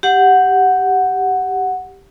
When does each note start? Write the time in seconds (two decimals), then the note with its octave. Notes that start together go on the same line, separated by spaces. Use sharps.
0.03 G4 F#5